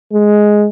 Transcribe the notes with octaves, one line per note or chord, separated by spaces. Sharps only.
G#3